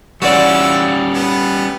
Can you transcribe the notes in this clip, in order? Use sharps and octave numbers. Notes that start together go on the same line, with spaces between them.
E3 G3 C#4 F4 F#4 D5 E6
B3